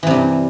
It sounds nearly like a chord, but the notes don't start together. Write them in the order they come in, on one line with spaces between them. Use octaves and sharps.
E3 C3 G2